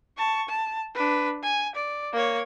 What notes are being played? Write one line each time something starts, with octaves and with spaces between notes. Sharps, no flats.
A5 C#6
A5
D4 B4
G#5
D5
A#3 C#5